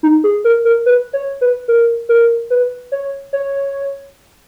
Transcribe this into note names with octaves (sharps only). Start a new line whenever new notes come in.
D#4
G#4
A#4
A#4
B4
C#5
B4
A#4
A#4
B4
C#5
C#5